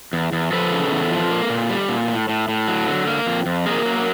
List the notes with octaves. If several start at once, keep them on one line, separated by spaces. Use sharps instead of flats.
E2
E2
F3 A4 B4
C#3
E2
F3
A#3
A#2
G3
A#2
A2
A2
A2
F#3
D3
A#3
F2
F2
A#3 G#4 A#4
F#3